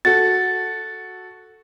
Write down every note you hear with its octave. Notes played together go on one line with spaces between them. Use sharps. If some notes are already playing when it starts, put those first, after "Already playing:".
F#4 A4 A6